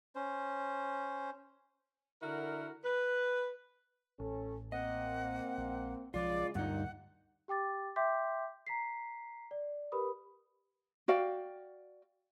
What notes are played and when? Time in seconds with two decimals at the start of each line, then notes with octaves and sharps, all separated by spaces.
0.15 C#4 C5
2.21 D3 E4 F#4 A#4
2.84 B4
4.20 A1 C#4 A4
4.72 A#3 C4 D#5 F#5
5.58 A#1
6.14 B1 C#3 F3 G#3 F4 D5
6.55 D2 G2 A#2 D#4 F#5
7.48 G4 G5 D6 A6
7.96 E5 G5 C6 D6 G6 B6
8.67 A#5 B6 C7
9.51 D5
9.92 G4 A#4 B4 B5 D#6
11.08 F#4 D5 F5 G5